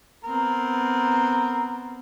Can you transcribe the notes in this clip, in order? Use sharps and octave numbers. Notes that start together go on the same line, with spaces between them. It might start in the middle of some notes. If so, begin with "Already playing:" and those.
B3 C4 A#4